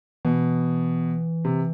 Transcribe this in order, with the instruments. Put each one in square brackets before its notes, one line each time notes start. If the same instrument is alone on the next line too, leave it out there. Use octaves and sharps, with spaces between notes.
[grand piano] B2 [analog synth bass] E3
[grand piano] C3